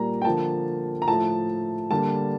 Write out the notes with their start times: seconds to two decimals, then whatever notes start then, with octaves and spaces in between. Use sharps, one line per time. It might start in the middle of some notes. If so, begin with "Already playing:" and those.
Already playing: A#2 G3 A#3 A#5
0.22 G5
0.25 D3 F3 A#3 A5
1.02 A#5
1.08 A2 F3 A3 A5
1.90 D3 G3 A#3 A5